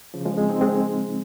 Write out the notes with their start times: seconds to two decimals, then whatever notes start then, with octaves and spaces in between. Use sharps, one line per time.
0.14 C#3 F3
0.25 F3 G#3
0.38 G#3 C4
0.49 C4 D#4
0.61 G#3 C4